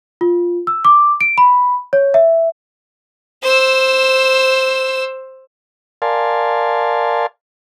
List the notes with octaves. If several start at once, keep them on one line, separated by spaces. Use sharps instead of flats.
F4
E6
D6
D7
B5
C#5
E5
C5 E6
A#4 D5 F5 G#5 A5 C6